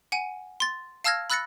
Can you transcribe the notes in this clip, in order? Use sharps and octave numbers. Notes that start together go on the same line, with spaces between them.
F#5 G#5 D#7
C6 A6
F5 A5 E6 F6 G#6 A#6
B5 E6 F#6 A6 A#6 C#7